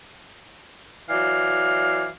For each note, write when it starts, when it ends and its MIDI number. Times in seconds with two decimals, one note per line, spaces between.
1.10 2.08 52
1.10 2.08 54
1.10 2.08 74
1.10 2.11 77